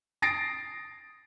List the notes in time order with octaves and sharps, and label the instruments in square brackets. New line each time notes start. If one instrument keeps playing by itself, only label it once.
[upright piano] D#6 A6 A#6 C7 D7